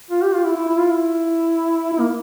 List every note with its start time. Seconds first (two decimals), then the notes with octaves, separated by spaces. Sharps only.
0.11 F4
0.22 G4
0.35 F4
0.45 E4
0.57 E4
0.68 E4
0.79 F4
0.90 E4
1.93 E4
1.99 A#3